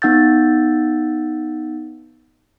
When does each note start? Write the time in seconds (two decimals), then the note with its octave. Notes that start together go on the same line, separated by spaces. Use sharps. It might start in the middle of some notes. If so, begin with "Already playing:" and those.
0.02 B3 D#4 F#5 E6 G6 A6